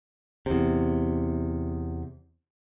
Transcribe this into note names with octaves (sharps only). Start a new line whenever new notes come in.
E2 C3